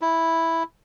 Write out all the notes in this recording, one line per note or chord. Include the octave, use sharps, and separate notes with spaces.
E4